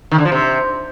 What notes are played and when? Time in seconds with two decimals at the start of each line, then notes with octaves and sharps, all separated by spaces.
0.12 D#3
0.18 D3
0.25 F3
0.32 C3